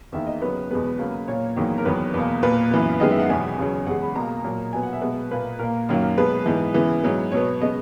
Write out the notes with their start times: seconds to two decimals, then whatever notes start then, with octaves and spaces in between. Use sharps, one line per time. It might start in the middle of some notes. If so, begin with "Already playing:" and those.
0.12 E2 D#3 A#3 E5
0.27 D#5
0.41 C#3 F#3 B3 B4
0.70 E2 B2 G#3 B3 B4
0.99 C#3 F#3 A#3
1.28 A#2 A#3 C#5
1.56 E2 D#3 F#3 A#3
1.78 A#4
1.85 E2 D#3 F#3 B3 B4
2.14 E2 B2 A#3
2.42 A#2 A#3 B4
2.71 F#2 E3 B3
3.00 F#2 D#3 G#3 B3 D#5
3.10 E5
3.19 F#5
3.30 E2 B2 F#3 B3 G#5
3.58 E2 C#3 F#3
3.86 E2 C#3 G#3 F#5
4.02 B5
4.15 B2 A#3 A#5
4.44 A#2 F#3 A#3
4.73 B2 F#3 B3 G#5
4.83 F#5
4.93 E5
5.01 B2 G#3 B3 B4
5.31 A#2 A#3 B4
5.59 A#2 A#3 A#4
5.89 F#2 D#3 F#3 A#3
6.17 B2 G#3 B3 B4
6.46 G#2 E3 B3
6.74 C#3 E3 B3
7.03 G#2 F#3 B3
7.32 B2 F#3 B3 C#5
7.60 C#3 G#3 B3 D#5